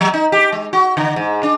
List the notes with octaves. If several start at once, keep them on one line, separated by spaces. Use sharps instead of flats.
F#3
D#4
G4
G#3
F#4
D3
G#2
D4